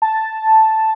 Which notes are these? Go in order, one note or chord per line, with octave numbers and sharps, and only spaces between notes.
A5